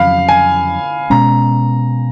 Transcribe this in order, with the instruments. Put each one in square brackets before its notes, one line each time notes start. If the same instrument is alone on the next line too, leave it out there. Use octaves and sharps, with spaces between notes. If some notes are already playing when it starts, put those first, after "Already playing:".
Already playing: [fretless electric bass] F2 C#3 F#3 [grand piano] F5 B5
[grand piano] G#5
[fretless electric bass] B2 G#3 C#4 [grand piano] A#5